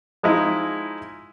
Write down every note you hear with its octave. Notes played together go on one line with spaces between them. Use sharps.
F3 G#3 D#4 E4